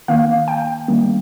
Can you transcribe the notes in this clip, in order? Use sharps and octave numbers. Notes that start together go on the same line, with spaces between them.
D#3 A#3 F5
G5
D#3 G3 A#3